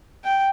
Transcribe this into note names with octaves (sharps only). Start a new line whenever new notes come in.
G5